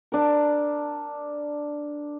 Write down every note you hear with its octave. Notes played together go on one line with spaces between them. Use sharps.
D4 A#4